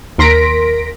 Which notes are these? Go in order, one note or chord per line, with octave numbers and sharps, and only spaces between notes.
D#2 A#4 C6 A#6 B6 D7